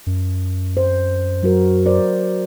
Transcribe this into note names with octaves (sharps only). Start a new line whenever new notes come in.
F#2
C5
F#3 F#4 A#4
A#4 C5 D5